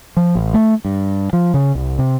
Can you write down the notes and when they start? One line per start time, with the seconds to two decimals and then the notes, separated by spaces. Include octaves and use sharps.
0.17 F3
0.35 A1
0.54 A3
0.85 G2
1.33 F3
1.54 C#3
1.75 C2
1.99 C3